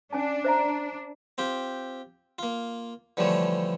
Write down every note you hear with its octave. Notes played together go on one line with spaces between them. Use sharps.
C#4 D4 G#5 A5
C5 E5 A#5
C4 F4 G4
A#3 F4
D3 E3 F3 G3 A3 C#5